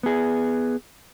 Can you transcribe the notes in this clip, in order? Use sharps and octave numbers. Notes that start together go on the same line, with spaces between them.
B3 G#4